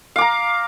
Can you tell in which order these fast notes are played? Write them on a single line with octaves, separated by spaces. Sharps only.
F5 D6 A#5